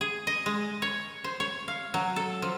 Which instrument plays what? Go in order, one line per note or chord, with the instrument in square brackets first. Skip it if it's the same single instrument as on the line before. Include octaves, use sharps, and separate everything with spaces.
[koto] G#4
D#5
G#3
C#5
C5
C#5
F5
F#3
A4
F3